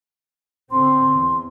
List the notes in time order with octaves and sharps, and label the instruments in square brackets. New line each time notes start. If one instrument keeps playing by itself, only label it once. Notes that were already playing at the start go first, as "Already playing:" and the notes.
[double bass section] D3 C4 [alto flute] C6
[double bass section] E2